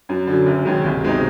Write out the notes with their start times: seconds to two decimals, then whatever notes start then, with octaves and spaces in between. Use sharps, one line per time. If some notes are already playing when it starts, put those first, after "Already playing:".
0.09 F#2
0.27 D3 F#3
0.46 F#1
0.65 F#2 D#3 G#3
0.84 C2
1.03 B2 G#3 C4 D#4